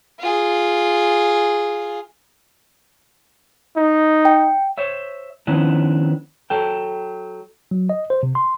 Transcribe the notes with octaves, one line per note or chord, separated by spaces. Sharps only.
F4 G#4
D#4
G5
C5 C#5 E5
D#3 F3 B3 C#4 D4 E4
F#3 A4 G5
F#3
D#5
C5
C3
C6